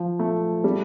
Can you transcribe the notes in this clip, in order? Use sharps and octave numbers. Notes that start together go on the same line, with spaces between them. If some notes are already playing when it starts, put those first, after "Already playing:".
Already playing: F3
A3
G3